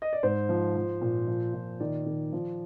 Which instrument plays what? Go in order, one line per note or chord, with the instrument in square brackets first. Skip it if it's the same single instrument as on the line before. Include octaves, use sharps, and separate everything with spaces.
[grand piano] D#5
D5
G#2 C5
F3
F3
A#2
F3
A#2
D#3 D5
D#3
F3